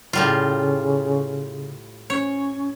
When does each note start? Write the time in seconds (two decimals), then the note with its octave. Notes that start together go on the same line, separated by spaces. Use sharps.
0.13 A2 C#3 G3 F4
2.10 C#4 C#5